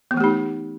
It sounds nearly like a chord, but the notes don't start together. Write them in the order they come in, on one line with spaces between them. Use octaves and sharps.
B3 E3 A3 G4 D#4